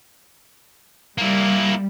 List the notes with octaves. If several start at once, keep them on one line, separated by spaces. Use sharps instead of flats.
G3 A#3 E4